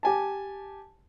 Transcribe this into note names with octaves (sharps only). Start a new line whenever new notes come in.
G4 G#5 A5